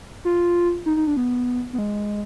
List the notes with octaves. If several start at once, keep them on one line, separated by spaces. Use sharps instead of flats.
F4
D#4
D#4
D4
B3
B3
G#3